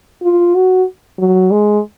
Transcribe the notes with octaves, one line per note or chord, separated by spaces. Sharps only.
F4
F#4
F#3
G#3